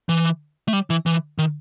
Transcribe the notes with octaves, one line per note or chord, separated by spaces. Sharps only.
E3
A3
G3
E3
E3
D#3